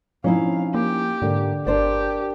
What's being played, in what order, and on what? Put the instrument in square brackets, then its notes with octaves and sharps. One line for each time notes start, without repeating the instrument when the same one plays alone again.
[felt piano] F3 [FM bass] C4 [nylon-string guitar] C#4 D#4 E4 [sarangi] F5
[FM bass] A#3 [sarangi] G4
[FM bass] G#2 [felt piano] D3 [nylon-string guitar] A#3
[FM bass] G1 [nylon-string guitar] D4 C5 D5 [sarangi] G4 [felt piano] A#4